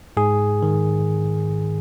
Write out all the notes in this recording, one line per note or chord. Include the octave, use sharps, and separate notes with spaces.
G#2 G#4
D#3